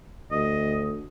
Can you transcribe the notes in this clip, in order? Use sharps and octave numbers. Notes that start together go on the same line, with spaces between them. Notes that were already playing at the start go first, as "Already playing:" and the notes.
D2 D#5